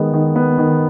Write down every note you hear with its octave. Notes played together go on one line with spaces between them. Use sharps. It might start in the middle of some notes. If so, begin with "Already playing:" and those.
Already playing: D#3 G#3 B3
D#3
B3
D#3